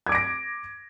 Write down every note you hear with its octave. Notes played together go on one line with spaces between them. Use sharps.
D6 G#6 A#6 D7